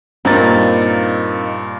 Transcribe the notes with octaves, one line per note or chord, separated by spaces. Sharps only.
G2 A#2 A#3 C4 D#4 A6